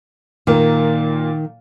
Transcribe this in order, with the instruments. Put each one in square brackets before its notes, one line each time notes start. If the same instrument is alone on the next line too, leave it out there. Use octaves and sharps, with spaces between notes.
[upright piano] A#2 A#3 [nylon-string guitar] D#3